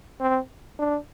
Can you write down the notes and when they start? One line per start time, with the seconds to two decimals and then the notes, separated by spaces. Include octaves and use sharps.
0.20 C4
0.79 D4